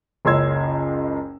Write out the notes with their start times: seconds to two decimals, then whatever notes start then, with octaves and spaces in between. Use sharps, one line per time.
0.25 F#1 C#2 C#5 C6 E6 G#6